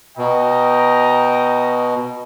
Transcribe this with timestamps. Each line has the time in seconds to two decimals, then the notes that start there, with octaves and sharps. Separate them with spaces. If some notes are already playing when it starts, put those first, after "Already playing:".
0.18 B2 D#5 G5 A#5